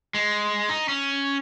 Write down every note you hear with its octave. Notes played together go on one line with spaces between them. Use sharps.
G#3
D#4
C#4